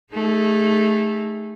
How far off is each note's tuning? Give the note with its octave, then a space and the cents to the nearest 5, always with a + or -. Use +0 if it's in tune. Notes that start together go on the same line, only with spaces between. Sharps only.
A3 -10 D#4 +0 G#4 -35